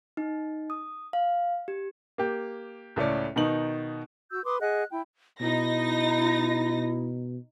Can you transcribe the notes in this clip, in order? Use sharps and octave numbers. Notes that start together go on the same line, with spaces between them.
D#4
D#6
F5
G4
A#3 G4
C#2 A2 C#4 D5
B2 D#3 D#4 F#7
F#4 E6 G6
B4 C6 D6 D#6
G#4 D#5 F#5 F#6
E4 G5
B2 D#4 E4 A#6